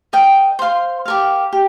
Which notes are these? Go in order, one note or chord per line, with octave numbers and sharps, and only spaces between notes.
A#4 D#5 G5
C5 F5 C6
G4 A#4 F5
G4